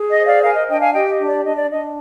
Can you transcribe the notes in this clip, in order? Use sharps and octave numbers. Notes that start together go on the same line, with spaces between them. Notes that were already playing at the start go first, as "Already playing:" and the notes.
Already playing: G#4
D#5
C5
D5 F5
A#4 F5 G#5
D#5
D4 D#5 G5
F5 G#5
G4 D#5 G5
D#5
D4
D5
D4 D#5
D5
D4 D#5